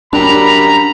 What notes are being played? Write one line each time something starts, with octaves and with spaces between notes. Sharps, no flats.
F#2 G3 D4 A#5 B5